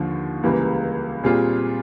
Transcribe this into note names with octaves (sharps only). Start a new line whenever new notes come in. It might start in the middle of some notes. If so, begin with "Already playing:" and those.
Already playing: D#2 D3 F3
C#2 C#3 E3 G3 A#3
A#2 G3 C4 F4 G#4